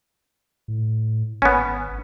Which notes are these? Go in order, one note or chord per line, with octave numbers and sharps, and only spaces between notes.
A2
G#1 B3 C#4